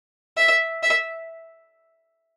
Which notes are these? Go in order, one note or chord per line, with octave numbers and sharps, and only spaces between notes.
E5
E5